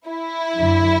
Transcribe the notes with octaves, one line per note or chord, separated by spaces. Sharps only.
E4
F#2 D3 F#3